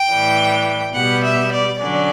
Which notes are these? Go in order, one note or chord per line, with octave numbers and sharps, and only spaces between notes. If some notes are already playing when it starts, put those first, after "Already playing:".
Already playing: G5
A2 E3 G3
B2 G3 B3 F#5
E5
D5
D3 F#3 C#4 D5